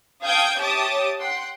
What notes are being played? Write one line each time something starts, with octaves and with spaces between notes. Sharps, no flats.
A4 F5 G5 D#6 G6 G#6
G4 C#5 E5 A5 D6 D#6
F#5 G5 C6